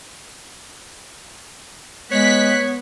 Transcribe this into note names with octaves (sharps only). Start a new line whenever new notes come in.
G#3 B3 C#5 F#6 B6